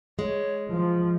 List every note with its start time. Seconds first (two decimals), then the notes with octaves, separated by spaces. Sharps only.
0.19 G#3 C#5
0.70 F3 F4